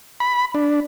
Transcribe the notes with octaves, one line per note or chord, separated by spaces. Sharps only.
B5
D4